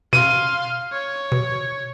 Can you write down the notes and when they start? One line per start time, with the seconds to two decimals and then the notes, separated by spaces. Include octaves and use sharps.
0.13 B2 F5 C6 D#7
0.92 C#5
1.32 B2